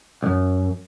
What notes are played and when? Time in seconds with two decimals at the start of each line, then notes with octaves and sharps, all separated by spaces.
0.23 C2 F#2